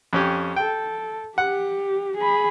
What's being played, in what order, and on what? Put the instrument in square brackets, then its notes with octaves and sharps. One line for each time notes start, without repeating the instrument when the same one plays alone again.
[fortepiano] F2 C#4 G4
[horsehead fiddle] A4 [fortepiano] G5
[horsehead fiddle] G4 [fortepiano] F#5
[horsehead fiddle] G#4 B5